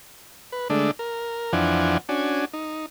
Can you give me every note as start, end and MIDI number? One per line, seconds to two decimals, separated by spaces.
0.52 0.68 71
0.70 0.91 50
0.70 0.91 56
0.70 0.91 57
0.70 0.91 62
0.99 1.53 70
1.53 1.98 41
1.53 1.98 52
1.53 1.98 53
1.53 1.98 62
1.53 1.98 78
1.53 1.98 80
2.09 2.45 61
2.09 2.45 62
2.09 2.45 66
2.09 2.45 80
2.53 2.86 63